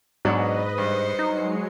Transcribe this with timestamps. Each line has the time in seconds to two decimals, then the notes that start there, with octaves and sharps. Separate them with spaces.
0.25 G#2 B2 F#3 D4 B4 D#5
0.78 G2 C5 C7 C#7
1.19 F#3 G#3 D#4